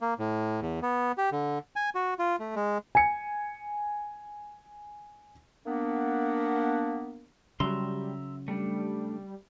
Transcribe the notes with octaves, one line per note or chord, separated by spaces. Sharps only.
A#3
A2
E2
B3
G4
D3
G#5
F#4
F4
A3
G#3
G#5 C#7
A#3 B3 D4
C#3 F#3 G3 E5 A#5 C6
G3 A3 D4